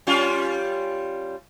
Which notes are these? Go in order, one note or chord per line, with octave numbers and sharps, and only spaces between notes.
G3 C#4 F4